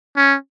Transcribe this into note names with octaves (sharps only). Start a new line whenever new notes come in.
C#4